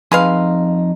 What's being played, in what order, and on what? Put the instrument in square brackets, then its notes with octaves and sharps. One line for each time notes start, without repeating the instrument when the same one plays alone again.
[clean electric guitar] F2 D#4 C6 [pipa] G#4 B4 F5